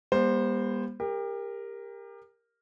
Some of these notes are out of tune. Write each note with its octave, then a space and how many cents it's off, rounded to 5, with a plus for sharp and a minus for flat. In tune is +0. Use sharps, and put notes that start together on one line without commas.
G3 +40 B3 -45 C5 +0
G4 +30 A#4 +0